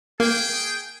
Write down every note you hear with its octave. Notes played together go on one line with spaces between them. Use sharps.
A#3 G#4 G5